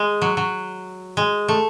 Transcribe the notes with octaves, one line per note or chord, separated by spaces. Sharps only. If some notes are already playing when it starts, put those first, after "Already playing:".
Already playing: G#3
F#3
F#3
G#3
A3